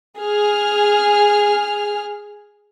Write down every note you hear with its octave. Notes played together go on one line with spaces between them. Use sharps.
G#4 F6